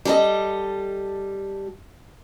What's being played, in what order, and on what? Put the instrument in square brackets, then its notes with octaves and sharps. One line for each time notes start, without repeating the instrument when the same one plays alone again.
[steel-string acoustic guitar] G3 A4 D#5